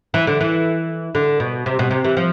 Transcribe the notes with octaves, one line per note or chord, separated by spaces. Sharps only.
E3
D3
E3
D3
B2
C3
B2
C3
E3
F3